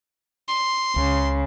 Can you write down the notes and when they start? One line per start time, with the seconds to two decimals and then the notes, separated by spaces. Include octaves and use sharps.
0.48 C6
0.96 C#2 C#3